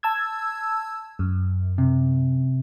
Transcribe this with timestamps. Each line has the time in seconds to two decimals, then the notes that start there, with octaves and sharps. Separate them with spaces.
0.03 A5 E6 G#6
1.19 F#2
1.78 C3